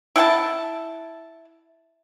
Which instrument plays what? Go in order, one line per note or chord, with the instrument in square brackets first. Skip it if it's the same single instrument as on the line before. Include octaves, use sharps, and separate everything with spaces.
[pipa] E4 F#5 G5 A5